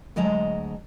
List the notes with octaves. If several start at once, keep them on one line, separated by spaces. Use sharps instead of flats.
D2 F#3 G#3 D#5 A5 A#5